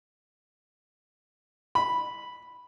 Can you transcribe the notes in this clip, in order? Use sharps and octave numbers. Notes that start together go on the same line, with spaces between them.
B5